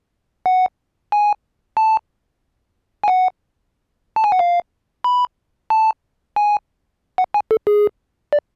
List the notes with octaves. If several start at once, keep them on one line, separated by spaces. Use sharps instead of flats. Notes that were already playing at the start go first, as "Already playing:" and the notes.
F#5
G#5
A5
G#5
F#5
A5
G#5
F#5
F5
B5
A5
G#5
F#5
G#5
A4
G#4
D5